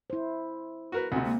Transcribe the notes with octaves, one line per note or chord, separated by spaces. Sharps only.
E4 C5
F#4 A#4 B4
D2 C3 C4
G#3 A#3